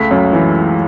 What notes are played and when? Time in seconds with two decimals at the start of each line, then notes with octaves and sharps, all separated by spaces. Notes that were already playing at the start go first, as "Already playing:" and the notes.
Already playing: C#2 A3 B6
0.11 F#2
0.33 E3